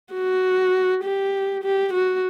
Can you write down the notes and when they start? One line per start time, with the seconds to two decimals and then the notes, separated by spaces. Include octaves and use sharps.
0.14 F#4
1.04 G4
1.63 G4
1.93 F#4